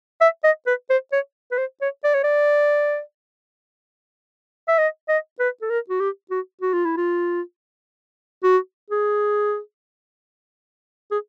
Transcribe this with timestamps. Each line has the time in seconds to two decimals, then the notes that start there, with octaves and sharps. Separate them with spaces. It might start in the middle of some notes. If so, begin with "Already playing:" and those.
0.21 E5
0.44 D#5
0.67 B4
0.90 C5
1.12 C#5
1.51 B4
1.58 C5
1.81 C#5
2.04 D5
2.15 C#5
2.24 D5
4.68 E5
4.78 D#5
5.09 D#5
5.39 B4
5.62 A4
5.70 A#4
5.90 F#4
6.00 G4
6.31 F#4
6.61 F#4
6.73 F4
6.85 E4
6.97 F4
8.44 F#4
8.90 G#4
11.11 G#4